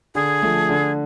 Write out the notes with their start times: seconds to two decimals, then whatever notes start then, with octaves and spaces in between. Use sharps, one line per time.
0.15 D3 G#4
0.42 F3 A3
0.69 D3